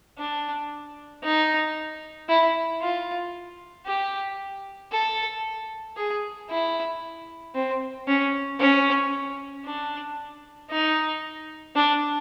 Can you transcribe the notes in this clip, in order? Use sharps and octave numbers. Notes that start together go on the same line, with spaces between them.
D4
D#4
E4
F4
G4
A4
G#4
E4
C4
C#4
C#4
D4
D#4
D4